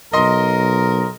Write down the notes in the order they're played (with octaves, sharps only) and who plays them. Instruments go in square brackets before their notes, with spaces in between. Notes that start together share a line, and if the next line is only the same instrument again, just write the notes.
[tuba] B1 [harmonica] A#4 [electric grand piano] D#5 C6